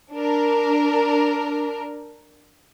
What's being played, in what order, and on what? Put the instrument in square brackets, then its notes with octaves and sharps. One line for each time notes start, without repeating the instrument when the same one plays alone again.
[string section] D4 A#4